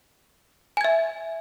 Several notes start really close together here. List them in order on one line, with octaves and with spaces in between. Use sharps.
G#5 G#6 E5